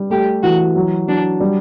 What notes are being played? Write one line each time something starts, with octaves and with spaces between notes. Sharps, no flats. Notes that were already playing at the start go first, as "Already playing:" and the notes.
Already playing: G3
A3 G4
E3 F#4
F#3
F#3 D4
G3